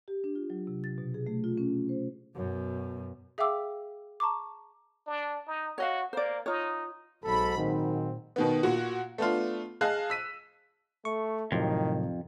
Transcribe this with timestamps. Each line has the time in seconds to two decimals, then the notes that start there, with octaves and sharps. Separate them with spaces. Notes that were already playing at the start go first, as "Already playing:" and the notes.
0.08 G4
0.24 D4
0.35 F4
0.50 F#3
0.67 C3
0.84 A6
0.98 B2
1.14 G#4
1.27 A3
1.44 F4
1.58 C#4
1.89 C5
2.35 F#2 B2
3.38 G#4 E5 F5 G5 D6 E6
4.20 A5 A#5 C#6 D6
5.06 D4
5.47 D#4
5.78 F#4 C#5 D#5 F5
6.13 A#3 C5 D5
6.46 D#4 F4 C#5
7.24 B1 G#2 F#3 A4 B5
7.58 A#2 D#3 C4
8.36 B2 D#3 B3
8.63 A#2 F#4
9.18 A3 B3 D4 F4
9.81 G#4 D#5 F5 A5 F#6
10.10 E6 B6 D#7
11.05 A3 C#6
11.52 F2 A2 C3 D#3 F#3